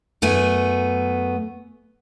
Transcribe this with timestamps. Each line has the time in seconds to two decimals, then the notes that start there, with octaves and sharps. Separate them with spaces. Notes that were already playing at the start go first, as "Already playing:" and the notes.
0.22 F#2 A3 B3 G#5